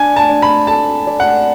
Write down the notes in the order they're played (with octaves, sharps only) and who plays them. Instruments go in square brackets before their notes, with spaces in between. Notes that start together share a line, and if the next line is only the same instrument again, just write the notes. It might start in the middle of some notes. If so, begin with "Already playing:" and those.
Already playing: [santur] D4 [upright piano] G#5
[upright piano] A5
[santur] D4
[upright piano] B5
[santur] A4 [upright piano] A5
[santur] D5
[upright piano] F#5